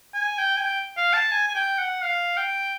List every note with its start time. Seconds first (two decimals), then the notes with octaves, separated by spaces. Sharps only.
0.14 G#5
0.38 G5
0.57 G#5
0.61 G5
0.97 F5
1.13 A5
1.32 G#5
1.48 G#5
1.55 G5
1.79 F#5
2.02 F5
2.37 G5